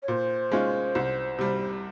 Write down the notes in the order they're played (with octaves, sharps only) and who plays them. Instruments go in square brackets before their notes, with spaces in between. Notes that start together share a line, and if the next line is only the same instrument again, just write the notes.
[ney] C#5
[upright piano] A#2 [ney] C5
[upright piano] G#3 C#4 F4
C2
C3 G3